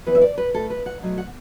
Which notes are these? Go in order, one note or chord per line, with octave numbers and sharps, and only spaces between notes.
E2 E3 B3 B4
E5
D5
B4
A2 A3 A4
B4
F#5
B2 F#3 A3
F#5